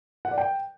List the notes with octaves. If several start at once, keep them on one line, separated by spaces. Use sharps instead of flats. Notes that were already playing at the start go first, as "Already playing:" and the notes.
F#5
D5
G5